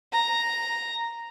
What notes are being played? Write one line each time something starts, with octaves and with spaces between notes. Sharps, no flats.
A#5